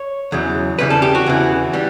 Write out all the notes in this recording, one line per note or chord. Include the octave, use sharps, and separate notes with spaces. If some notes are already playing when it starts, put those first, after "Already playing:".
Already playing: C#5
E2 C#3 F#3
E2 C#3 E3 G3 B4
A4
G4
F#4
E2 C#3 E3
E3 G3